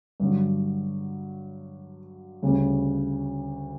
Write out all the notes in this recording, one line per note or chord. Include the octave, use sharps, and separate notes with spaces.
G2 D3 F#3
D2 C#3 G3 C#4